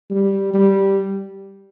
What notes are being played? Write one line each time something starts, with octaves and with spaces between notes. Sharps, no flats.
G3
G3